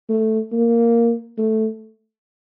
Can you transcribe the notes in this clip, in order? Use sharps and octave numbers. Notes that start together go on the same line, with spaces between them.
A3
A#3
A3